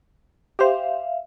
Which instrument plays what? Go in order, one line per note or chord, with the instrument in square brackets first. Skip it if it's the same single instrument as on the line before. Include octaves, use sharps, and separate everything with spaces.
[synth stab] G4 C5 [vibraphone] E5 F5